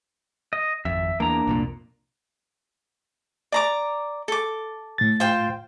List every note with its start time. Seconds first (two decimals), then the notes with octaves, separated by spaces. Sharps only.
0.53 D#5
0.85 G#1 F2 E5
1.20 E2 A#3 D4 A#5
1.47 C2 F2 A#2
3.52 D5 A#5 D6
4.28 A4 D6
4.98 A2 A6
5.20 F4 C5 G5